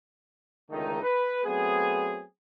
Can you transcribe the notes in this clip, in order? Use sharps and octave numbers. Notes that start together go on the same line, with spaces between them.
C#2 D3 D#3 G#3 A3 D#4
B4
F#3 A3 B3 C4 G#4